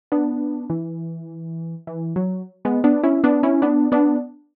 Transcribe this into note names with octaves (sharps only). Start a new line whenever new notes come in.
B3 D4
E3
E3
F#3
G#3 B3
B3 D4
C#4 E4
B3 D4
C#4 E4
B3 D4
B3 D4